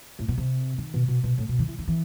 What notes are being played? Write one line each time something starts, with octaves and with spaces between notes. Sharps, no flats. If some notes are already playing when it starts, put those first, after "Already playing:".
A2
B2
C3
D#3
B2
B2
B2
A2
B2
D#3
E3
D#3
E3